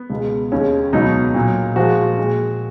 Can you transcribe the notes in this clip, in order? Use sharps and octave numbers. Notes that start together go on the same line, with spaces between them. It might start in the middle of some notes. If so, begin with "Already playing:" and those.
Already playing: B3
C#2 B2 G#3
D#2 C#3 G#3 C#4
C#2 B2 F#3 D#4
A#2 F#3
A#2 F3 G#3 F#4
A#2 G#3